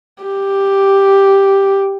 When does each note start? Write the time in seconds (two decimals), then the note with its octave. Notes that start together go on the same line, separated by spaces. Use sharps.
0.23 G4